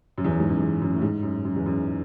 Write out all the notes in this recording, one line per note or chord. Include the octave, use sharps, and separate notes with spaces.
F#2
E2
F#2
G#2
F#2
E2
F#2
A2
G#2
F#2
F#2
E2
F#2